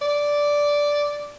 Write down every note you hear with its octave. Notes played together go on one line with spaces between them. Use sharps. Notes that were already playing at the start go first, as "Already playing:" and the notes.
D5